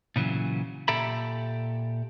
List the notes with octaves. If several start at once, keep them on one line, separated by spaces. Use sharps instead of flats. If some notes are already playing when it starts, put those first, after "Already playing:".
A#2 C#3 E3 F#3
A#2 G4 A4 E5 A#5 B5